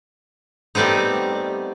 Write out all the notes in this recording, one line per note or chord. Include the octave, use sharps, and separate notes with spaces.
G3 A3 B3 C4 D#4